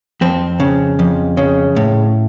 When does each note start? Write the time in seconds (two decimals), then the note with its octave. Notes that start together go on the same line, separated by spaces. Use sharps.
0.21 F2 C4
0.60 C#3
0.99 F2
1.37 C#3
1.76 A2